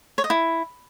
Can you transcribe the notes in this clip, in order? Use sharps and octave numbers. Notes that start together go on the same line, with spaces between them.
C#5
D#5
E4